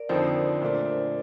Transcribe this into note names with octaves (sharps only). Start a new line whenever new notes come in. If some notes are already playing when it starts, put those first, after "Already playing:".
Already playing: A#4 D5
F2 D3 F3 C4 D#4 C5
A#2 A3 D4